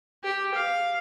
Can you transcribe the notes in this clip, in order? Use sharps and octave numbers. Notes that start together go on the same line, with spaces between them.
G4
F5